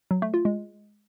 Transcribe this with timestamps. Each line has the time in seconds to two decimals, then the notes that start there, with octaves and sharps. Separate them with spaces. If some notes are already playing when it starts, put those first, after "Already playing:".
0.11 F#3
0.22 A3
0.34 F4
0.45 G#3